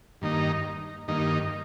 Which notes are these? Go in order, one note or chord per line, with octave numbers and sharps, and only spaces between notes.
G2 D#3 A#3 D#4
G2 D#3 A#3 D#4